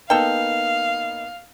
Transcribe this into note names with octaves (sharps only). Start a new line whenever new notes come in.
A#3 B3 D#4 A4 F5 G5